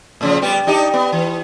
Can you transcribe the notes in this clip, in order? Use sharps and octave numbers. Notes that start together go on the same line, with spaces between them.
A2 C#3 F3
G3 B3 G4
D4 D#4 G4
B3
E3